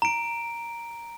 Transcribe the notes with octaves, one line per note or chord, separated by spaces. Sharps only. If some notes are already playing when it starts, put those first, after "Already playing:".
A#5 D7